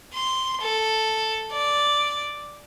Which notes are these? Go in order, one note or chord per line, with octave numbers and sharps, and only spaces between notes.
C6
A4
D5